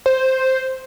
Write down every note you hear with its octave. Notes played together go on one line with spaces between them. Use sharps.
C5